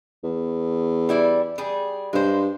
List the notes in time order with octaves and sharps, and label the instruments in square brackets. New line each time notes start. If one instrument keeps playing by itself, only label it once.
[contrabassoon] E2
[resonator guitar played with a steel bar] G3 E4 D5
G3 G#4
[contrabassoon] G2 [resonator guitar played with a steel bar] G#3 C5